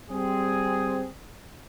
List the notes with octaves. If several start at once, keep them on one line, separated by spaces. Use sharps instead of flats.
G3 C4 G#4